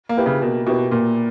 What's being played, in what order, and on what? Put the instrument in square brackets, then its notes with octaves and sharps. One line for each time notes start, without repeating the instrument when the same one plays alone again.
[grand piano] A#3
[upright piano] E4 G4 B4
[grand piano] C#3
[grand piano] B2 [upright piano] A#3
[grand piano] B2 [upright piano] E4 G4 B4
[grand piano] A#2 [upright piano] A#3